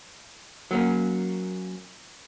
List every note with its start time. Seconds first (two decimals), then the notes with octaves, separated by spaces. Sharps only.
0.71 F#3 A#3 C#4